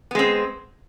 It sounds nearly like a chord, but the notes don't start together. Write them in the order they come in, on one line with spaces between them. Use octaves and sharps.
B3 G#3 C4